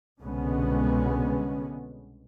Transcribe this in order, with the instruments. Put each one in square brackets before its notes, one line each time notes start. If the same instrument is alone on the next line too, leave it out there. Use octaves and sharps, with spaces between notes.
[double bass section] C2 B2 D3 G#3 B3 C#4